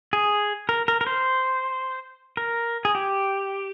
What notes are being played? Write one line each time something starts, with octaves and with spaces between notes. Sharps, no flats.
G#4
A#4
A#4
A#4
C5
A#4
G#4
G4